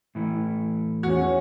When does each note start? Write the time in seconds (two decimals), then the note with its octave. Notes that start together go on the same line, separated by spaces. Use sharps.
0.15 A2 E3 A3
1.03 E2 C#4 F#4